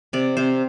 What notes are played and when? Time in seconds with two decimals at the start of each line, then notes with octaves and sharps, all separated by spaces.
0.13 C3 D5
0.37 C3 C5